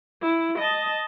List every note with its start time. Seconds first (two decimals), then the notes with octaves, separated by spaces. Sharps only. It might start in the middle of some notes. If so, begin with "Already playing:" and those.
0.22 E4
0.59 D#5 A5